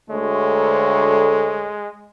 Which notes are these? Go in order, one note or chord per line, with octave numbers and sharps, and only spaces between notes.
D2 G#3 A3 C#5